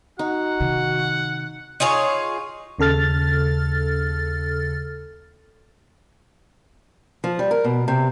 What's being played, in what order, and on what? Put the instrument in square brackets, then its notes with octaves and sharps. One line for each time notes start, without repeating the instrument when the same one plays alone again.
[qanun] D#4 [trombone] F#4 [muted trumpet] F#5
[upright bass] C3 D#3
[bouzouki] D#4 F4 G#4 C#5
[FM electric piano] D#2 C#3 A4 F6 A6
[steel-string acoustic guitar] F3
G3
A#4
B2
C3